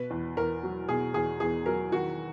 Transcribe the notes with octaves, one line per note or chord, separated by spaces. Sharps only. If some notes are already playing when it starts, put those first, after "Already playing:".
Already playing: B2 B4
E2
E2 A#4
F#3
B2 G#4
E2 G#4
E2 G#4
F#3 A#4
D#3 F#4